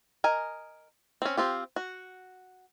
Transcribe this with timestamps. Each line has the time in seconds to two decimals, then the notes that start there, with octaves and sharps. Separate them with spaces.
0.24 A#4 D#5 G#5
1.22 C4 C#4
1.37 C4 F4 G4
1.76 F#4